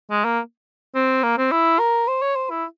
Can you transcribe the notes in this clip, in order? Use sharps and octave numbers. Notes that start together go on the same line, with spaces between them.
G#3
A#3
C4
A#3
C4
E4
A#4
C5
C#5
C5
E4